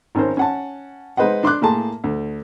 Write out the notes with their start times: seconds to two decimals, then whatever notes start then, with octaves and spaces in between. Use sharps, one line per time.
0.15 G#1 C#4 A#4 C5
0.37 C#4 F#5 A5
1.17 G#3 D#4 B4 C5 D#5 F#5
1.43 D4 C6 D6 F#6
1.62 A2 A#3 G#4 A5 C6
2.04 D2